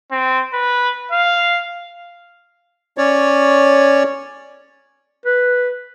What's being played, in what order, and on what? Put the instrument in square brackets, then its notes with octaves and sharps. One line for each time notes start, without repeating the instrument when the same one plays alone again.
[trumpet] C4
B4
F5
[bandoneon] C#4 C#5 D5
[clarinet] B4